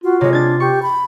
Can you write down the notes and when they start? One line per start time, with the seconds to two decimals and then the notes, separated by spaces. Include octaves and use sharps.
0.04 F4 F#4
0.21 C3 G#3 C#5
0.33 D4 G#6 A6
0.60 G4 C#6
0.82 B5